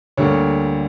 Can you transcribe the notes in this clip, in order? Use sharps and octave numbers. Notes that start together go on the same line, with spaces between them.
D2 D3 G3 A#3 C#5